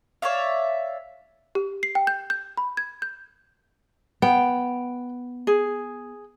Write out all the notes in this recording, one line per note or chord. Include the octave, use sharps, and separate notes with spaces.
C#5 D5 E5 F5
G4
C7
G5
G6
G6
B5
G#6
G6
B3 G5
G#4